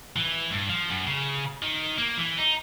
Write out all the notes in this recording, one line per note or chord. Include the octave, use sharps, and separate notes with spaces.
E3
G2
F3
F#2
C#3
D#3
A#3
E3
D#4